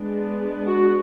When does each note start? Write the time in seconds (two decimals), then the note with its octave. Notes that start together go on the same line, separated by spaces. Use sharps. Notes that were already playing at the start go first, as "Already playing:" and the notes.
Already playing: G#3 B3 D4
0.67 F#4